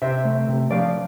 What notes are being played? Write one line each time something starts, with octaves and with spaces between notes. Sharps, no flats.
C3 C5 E5
A3
C3
F3 D5 F5